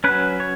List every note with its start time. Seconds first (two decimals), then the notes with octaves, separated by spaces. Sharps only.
0.04 F#3 C#4 B4
0.40 C#5